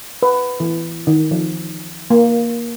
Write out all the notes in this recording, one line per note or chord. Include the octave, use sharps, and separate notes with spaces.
B4
E3
D#3
F3
A#3